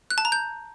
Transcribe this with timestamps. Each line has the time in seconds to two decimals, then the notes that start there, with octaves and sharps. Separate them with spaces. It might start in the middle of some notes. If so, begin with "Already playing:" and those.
0.10 F#6
0.18 A5
0.25 A#5
0.32 G6